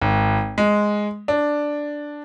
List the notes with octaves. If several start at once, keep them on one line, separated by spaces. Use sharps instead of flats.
G#1
G#3
D4